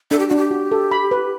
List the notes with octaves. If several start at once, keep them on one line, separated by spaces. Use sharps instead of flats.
D4 A4
G4
D4 F#4
G4
F#4
A4
B5
B4